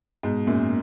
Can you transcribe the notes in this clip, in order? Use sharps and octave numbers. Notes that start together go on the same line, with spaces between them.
G#2 B2
F#2 A#2